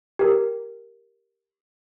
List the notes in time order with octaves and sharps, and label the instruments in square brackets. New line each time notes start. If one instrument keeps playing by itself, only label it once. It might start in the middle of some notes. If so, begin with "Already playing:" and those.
[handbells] G4 A#4